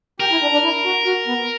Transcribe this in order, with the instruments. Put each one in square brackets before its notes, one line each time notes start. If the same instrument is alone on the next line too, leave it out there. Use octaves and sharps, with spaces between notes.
[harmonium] G4 [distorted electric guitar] A#4
[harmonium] E4
D4
D4
E4
F#4
F#4
B3